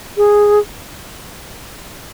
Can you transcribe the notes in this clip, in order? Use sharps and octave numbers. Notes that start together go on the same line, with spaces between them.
G#4